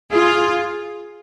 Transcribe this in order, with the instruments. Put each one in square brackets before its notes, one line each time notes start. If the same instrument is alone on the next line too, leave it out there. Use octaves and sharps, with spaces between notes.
[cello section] F4 [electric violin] G#4